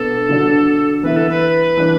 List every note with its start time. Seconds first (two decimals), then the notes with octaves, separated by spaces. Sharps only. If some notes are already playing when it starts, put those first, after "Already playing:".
Already playing: B2 B3 D4 A4
0.29 D3 F#3 D4
1.03 E3 B3 E4 B4
1.16 A4
1.29 B4
1.77 E3 D4